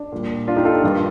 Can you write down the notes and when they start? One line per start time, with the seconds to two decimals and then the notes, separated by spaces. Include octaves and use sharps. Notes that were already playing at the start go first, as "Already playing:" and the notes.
Already playing: D4
0.12 A#2 G3
0.48 D4 F4
0.56 D#4 G4
0.65 F4 A4
0.83 G2 D#3 G3